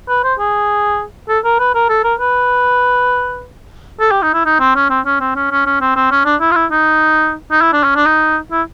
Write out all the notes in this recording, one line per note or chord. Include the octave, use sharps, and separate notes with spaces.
B4
C5
G#4
A4
A#4
B4
A#4
A4
A#4
B4
A4
G4
D#4
E4
D#4
C4
C#4
C4
C#4
C4
C#4
C#4
C#4
C4
C4
C#4
D4
E4
F4
E4
D#4
D#4
E4
D4
C#4
D4
D#4
E4